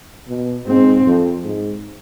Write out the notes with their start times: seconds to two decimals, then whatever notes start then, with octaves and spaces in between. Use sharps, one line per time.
0.29 B2
0.67 G#2 C4
1.06 F2
1.44 G#2